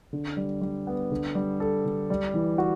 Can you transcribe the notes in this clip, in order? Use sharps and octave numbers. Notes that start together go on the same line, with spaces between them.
D3
G3
G3
B3
D3
G3
A4
D3
G3
E3
F#4